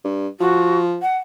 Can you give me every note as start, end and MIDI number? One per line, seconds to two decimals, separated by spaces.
0.04 0.27 43
0.40 0.99 53
0.40 0.78 66
1.02 1.17 78